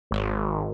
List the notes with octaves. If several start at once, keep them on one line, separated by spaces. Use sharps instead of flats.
G#1